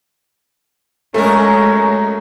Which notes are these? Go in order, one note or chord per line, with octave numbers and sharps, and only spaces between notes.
F#2 G#3 A3 C#4 A#4